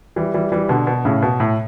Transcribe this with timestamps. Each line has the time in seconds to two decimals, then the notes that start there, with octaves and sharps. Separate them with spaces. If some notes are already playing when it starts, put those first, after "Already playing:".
0.16 E3 G3
0.34 E3 G3
0.52 E3 G3
0.69 B2 D3
0.87 B2
1.05 A2 C#3
1.22 B2
1.40 A2